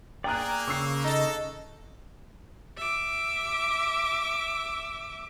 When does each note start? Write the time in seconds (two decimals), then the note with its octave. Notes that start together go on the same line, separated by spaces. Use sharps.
0.24 A#3 G#4 D5 G5 A#5 F#6
0.68 C#3 C#6 E6 C7
1.04 D#4 A4 D#5
2.77 E5 D6